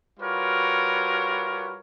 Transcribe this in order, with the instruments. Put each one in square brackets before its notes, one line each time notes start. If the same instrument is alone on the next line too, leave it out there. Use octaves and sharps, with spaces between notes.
[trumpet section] G3 F4 F#4 A#4 B4 C#5